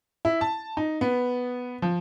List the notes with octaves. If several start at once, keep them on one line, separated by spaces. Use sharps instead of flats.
E4
A5
D#4
B3
F3